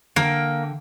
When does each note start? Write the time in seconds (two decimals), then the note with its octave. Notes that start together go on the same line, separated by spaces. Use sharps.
0.16 D3 A#3 G5